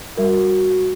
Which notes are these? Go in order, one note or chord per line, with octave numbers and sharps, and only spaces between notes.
G3 F#4 A#4